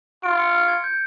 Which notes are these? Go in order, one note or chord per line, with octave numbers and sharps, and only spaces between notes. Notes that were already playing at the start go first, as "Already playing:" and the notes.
F4 D7
C#7
C#7
G#6
G6